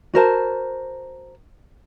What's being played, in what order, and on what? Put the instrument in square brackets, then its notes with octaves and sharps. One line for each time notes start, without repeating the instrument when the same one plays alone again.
[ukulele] F#4 A#4 C5 A5